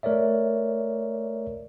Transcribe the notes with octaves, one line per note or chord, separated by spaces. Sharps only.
A3 A#4 C#5 D5 E5